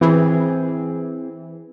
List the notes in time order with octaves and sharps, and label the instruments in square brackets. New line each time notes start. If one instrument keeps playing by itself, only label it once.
[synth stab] E3 [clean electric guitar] C4 G#4